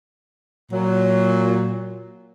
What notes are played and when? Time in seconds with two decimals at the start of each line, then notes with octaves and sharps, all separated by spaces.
0.72 A#2 F#3